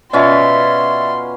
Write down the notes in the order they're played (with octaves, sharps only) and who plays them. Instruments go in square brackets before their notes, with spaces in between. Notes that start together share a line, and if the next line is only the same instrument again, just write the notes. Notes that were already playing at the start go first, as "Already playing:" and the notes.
[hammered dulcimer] B2 C#4 F4 [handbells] D5 E5 [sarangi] C6